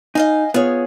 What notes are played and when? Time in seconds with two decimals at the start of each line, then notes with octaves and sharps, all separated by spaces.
0.15 D#4 D#5 F5 G#5
0.54 B3 F4 G#4 C#5